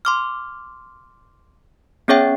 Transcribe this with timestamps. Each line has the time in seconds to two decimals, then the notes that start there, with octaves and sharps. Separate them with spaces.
0.05 C6 D6 F6
2.08 B3 C#4 G#4 C#5 E5 G5